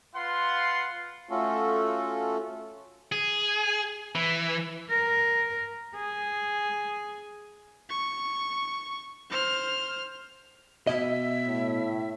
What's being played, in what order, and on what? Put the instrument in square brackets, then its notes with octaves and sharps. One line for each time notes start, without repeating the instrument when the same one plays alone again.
[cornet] F4 [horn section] B4 F#5 C6
[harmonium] A3 C#4 F4 F#4 A4
[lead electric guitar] G#4
E3
[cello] A#4
G#4
[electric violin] C#6
C5 F6
[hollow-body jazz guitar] B2 D#5 [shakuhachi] E5
[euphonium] A2